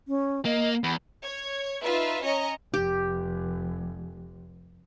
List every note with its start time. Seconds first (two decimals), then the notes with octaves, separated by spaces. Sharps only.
0.08 C#4
0.45 A#3 D#5
0.84 E2 B5
1.22 C#5 G#6
1.83 D#4 F4 B4 E5
2.22 C#4 C#5 D#5 A#5
2.74 F1 G4